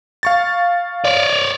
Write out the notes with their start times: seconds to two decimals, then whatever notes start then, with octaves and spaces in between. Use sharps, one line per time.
0.23 F5 C#6 A6
1.05 C#5 D5